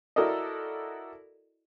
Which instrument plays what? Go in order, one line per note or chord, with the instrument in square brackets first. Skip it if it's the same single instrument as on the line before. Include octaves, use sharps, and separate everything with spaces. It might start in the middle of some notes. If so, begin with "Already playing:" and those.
[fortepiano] E4 F#4 A4 A#4 D5 D#5